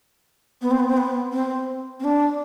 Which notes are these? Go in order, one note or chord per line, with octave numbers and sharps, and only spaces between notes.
B3
C4
B3
C4
B3
C4
C4
D4